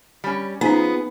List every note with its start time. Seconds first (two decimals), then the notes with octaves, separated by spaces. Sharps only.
0.24 G3 C#4
0.61 F3 B3 C#4 D#4 G#4